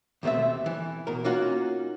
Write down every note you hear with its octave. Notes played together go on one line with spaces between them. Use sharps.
D#2 B2 A3 C4 E5
E3
B2 A#4
A#3 C#4 D#4 F4 F#4